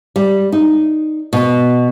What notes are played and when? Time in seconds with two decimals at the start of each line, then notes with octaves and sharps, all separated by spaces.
0.16 G3
0.52 D#4
1.33 B2